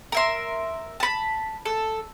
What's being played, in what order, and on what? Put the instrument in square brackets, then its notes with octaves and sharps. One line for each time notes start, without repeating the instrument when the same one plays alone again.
[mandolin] A#4 E5 C6
A5 B5
A4